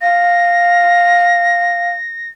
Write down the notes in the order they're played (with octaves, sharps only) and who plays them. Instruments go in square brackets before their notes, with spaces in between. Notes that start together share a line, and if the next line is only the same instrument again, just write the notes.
[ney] F5 [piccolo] A#6